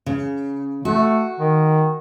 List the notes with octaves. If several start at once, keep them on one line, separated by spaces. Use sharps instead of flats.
C#3
A3 F#4
D#3